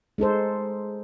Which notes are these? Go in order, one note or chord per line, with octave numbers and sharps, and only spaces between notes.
G#3 D#4 A4 C5